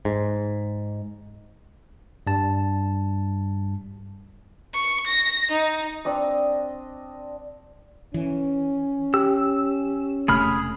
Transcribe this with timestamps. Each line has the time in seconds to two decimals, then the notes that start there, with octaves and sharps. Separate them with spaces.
0.05 G#2
2.27 G2 G3 A5
4.74 C#6
5.07 A#6
5.51 D#4
6.05 C4 D4 D#5
8.14 E3 C#4
9.14 G4 E6
10.28 E1 C3 A3 G#4 B5 F6